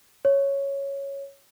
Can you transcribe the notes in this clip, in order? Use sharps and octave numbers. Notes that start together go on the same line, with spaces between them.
C#5